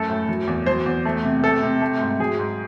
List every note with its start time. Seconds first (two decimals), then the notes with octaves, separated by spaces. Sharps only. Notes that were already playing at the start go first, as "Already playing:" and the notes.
Already playing: F#2 A3 A4
0.10 A2
0.29 F#3
0.47 E2
0.66 F#3 C5
0.86 E2
1.05 A3
1.24 C3
1.43 A3 A4
1.62 C3
1.82 A3
2.01 G#2
2.20 F#3 G#4
2.39 G#2